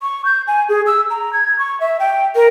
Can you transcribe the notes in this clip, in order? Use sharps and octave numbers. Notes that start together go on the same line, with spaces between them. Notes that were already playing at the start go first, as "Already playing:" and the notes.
C#6
G6
G#5
G#4
E6
A#5
G#6
C#6
E5
G5
A#4